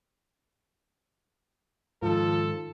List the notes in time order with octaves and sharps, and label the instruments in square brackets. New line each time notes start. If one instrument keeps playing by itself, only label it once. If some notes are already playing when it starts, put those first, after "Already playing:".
[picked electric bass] G#2 D#3 [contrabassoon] F3 [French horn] A4